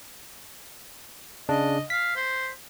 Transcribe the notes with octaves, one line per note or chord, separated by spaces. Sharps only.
C#3 D4 D#5 A5
F5 B6
C5